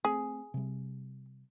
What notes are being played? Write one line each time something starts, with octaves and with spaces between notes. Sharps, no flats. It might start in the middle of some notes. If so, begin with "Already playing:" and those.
A3 C4 G#4
C3 G3